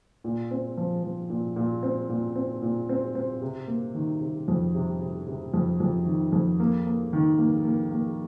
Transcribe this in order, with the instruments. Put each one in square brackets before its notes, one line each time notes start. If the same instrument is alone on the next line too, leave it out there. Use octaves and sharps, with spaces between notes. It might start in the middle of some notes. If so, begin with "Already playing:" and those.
[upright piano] A#2
C4
F3
F3
A#2
A#2
C4
A#2
C4
A#2
C4
C4
C3
A#3
D#3
C3
F2
C3
C3
C3
F2
F2
D#3
F2
A#3
A#3
D#3
A#3
A#3
A#3